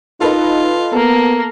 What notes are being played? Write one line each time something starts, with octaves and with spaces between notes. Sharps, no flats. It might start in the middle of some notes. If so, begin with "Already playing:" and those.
D#4 F4 A4 B4 D#5
A#3 B3 A4